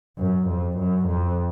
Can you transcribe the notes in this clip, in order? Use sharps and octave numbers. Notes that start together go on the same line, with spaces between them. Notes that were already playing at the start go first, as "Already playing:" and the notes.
F#2
F2
F#2
F2